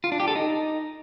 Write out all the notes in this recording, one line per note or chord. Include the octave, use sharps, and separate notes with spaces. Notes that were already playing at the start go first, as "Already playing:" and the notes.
F4
D4
G4
A4
D#4